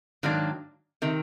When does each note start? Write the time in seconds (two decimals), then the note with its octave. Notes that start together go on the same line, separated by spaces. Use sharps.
0.23 G#2 D#3 F#3 A#3 D4
1.02 C3 D#3